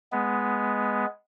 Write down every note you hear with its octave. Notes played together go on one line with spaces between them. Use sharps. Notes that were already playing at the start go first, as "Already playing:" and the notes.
G#3 B3